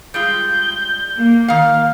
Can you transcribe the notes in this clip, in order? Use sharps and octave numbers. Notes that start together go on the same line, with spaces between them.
G3 G#3 F4 G6
A#3
D#3 F5 F6